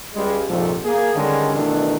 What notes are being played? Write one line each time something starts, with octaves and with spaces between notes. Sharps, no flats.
C#2 G3 G#3
A#1 F2 G#2 C3 F3 A4
A#3 G#4
D3 D#3 G3 G#3 C#4 D4
B2 D#3 E3 A3 D4